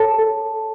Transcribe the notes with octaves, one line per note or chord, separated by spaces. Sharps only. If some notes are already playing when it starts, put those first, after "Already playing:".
Already playing: A4 C#5 A5
A4